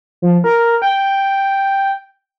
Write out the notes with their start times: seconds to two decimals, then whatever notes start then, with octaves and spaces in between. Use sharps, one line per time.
0.22 F3
0.44 A#4
0.82 G5